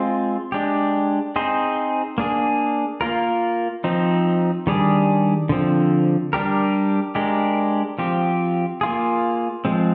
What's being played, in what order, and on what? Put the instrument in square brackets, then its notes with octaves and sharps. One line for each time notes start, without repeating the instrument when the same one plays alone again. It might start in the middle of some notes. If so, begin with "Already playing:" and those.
Already playing: [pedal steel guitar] G#3 C4 F4
G#3 D4 G4
C4 D#4 G#4 C5
A#3 D4 G#4
A#3 F4 A#4
F3 C4 D#4
D#3 G3 D4 G#4
D3 F3 C4
G3 D4 G4 A#4
G#3 D4 G4 A#4
F3 C4 G4
A#3 F4 G#4
F3 G#3 C4